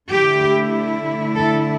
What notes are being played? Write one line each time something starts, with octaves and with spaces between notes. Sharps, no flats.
D3 A3 E4 G4
A4